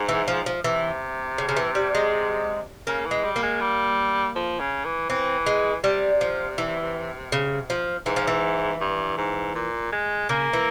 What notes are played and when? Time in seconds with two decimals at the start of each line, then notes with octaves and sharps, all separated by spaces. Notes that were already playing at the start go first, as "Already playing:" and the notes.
Already playing: G#2
0.09 E3
0.28 F3
0.46 F3
0.64 C3 E3
1.38 C#3
1.49 C#3
1.56 E3
1.75 G3
1.95 G#3
2.87 C#3 A#3
3.05 E3
3.11 G#3
3.24 G3
3.36 A#3
3.43 G#3
3.61 G3
4.36 F3
4.60 C#3
4.85 E3
5.10 E3 C4
5.46 G#3
5.84 C3 G3
6.21 F3
6.58 E3
7.32 C#3
7.70 F3
8.06 G#2 E3
8.16 F3
8.27 E3
8.81 G2
9.17 G#2
9.55 A#2
9.92 G#3
10.29 C#3 A#3
10.53 E3